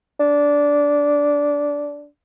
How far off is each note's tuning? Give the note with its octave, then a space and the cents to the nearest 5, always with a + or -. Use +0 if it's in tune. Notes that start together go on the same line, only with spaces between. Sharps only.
D4 -15